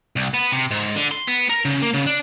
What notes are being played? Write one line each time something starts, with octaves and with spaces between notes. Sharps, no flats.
C2
B3
C3
G#2
D3
C6
B3
A#4
C#3
A#3
C#3
D4